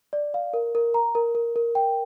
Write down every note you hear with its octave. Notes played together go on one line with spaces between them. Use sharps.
D5
F5
A#4
A#4
A#5
A#4
A#4
A#4
G5